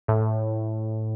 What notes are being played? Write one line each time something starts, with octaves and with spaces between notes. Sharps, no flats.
A2